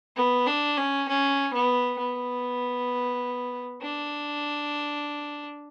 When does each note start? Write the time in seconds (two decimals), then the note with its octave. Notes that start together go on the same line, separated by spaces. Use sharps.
0.16 B3
0.47 D4
0.78 C#4
1.08 C#4
1.54 B3
1.99 B3
3.81 D4